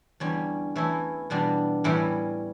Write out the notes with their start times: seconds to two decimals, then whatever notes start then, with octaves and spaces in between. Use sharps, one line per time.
0.20 E2 D3 G3 C#4
0.76 E3 A3 C#4 E4
1.30 E2 B2 G3 D4
1.84 A2 E3 G3 C#4 E4